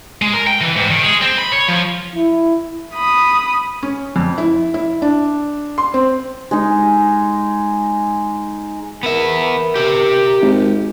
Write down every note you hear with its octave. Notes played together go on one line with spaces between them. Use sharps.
G#3
A#4
G5
E3
G#2
D#3
G#3
C4
B5
C#5
F3
E4
B5 D#6
C#4
F2
E4
E4
D4
C6
C4
G#3 D#4
B3 A#4 E5
G4 E5
G#1